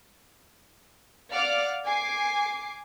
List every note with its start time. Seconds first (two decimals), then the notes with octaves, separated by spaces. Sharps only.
1.30 D5 F5 F#5 D6 F6
1.83 G#5 D6 C7